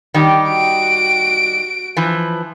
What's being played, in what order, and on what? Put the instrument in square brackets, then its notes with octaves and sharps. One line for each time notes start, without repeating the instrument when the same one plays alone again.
[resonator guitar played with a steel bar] D#3 G3 G4
[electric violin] F#4 D7
[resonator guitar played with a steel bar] E3 F3